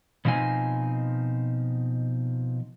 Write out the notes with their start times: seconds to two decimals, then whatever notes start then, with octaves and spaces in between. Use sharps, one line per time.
0.25 B2 F3 C4 D#4 G#5